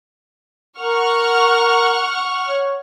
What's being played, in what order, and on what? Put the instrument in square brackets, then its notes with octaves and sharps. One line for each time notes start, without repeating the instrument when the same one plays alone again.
[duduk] A#4 [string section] F#5 C#6 F6
[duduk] C#5